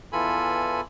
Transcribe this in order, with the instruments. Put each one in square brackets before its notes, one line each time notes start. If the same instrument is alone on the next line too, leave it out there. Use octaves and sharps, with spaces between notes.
[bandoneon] E2 E3 F4 A4 G#5 B5